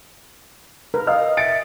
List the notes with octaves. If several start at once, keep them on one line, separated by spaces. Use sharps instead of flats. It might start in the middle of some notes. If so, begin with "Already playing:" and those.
A#4 B4
D#5 F5 D#6 F6
E5 A6 C#7 D7